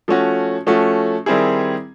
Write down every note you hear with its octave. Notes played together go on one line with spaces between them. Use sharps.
F3 A3 C#4 F#4
F3 A3 C#4 F#4
D#3 G3 C4 E4 G#4